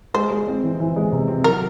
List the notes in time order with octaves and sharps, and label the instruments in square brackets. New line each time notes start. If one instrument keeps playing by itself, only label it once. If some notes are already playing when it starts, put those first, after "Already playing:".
[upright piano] G#3 [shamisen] C5
[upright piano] G#3
C4
E3
E3
G#3
C3
C4
[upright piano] F#3 [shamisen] A#4